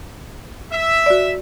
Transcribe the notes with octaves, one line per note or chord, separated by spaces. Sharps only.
E5
F#4 D5